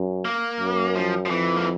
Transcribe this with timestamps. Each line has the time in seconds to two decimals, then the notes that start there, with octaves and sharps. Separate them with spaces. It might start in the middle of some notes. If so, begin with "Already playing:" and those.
Already playing: F#2
0.25 A#3
0.60 F#2
0.95 F3
1.26 F3
1.30 F2 E3
1.56 A#3